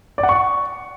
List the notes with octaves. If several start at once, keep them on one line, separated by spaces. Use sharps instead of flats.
D5
F#5
C#6